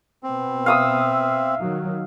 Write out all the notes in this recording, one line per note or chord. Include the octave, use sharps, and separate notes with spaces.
B2 B3 C4
E5 F5 D#6 E6
D#3 F#3